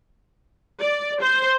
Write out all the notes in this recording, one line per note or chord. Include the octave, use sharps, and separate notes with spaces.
D5
C5